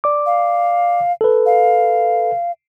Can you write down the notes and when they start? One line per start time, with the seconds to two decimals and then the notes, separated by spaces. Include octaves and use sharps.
0.04 D5 D6
0.26 F5
1.21 A4 B4
1.46 F5